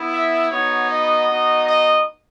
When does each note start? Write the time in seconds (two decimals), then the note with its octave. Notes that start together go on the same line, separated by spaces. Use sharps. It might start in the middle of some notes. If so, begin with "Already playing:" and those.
Already playing: B3 E4
0.11 E5
0.50 B3 D#4 F#4 C#5
0.88 D#5
1.28 B3 D#4 F#4
1.65 D#5